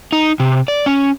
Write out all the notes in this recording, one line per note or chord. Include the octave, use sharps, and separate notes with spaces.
D#4
C3
D5
C#4